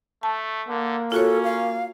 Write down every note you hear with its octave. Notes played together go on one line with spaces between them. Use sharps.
A3 A5
D3 A#3
C#4 F4 F#4 A4 C#5
F5